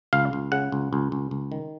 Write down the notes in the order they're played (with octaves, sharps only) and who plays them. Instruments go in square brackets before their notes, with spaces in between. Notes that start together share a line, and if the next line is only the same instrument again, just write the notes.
[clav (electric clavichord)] C#2 F5
C#2
C#3 F#5
C#2
C#2
C#2
C#2
D#3